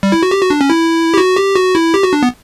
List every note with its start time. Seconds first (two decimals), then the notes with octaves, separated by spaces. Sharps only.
0.03 G3
0.12 E4
0.23 F#4
0.31 G4
0.42 F#4
0.50 D4
0.61 C#4
0.70 E4
1.14 G4
1.18 F#4
1.36 G4
1.56 F#4
1.75 E4
1.94 G4
2.03 F#4
2.13 D4
2.23 B3